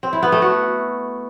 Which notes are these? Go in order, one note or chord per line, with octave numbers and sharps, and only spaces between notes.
C4
E4
B3
A3
F#4